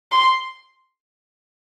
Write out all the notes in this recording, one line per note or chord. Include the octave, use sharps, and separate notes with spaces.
C6